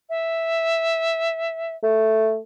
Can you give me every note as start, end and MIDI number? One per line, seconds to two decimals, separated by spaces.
0.09 1.75 76
1.83 2.38 57